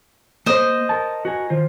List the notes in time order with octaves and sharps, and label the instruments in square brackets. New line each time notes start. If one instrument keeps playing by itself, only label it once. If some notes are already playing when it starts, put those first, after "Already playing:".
[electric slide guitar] A#3 [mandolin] C5 D#5
[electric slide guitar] A#4 A5
F#4 A#4 G#5
D#3 F4 C5